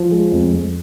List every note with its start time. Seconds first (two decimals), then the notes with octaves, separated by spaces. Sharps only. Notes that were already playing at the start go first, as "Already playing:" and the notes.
Already playing: F3
0.11 G#3
0.32 F2
0.53 F2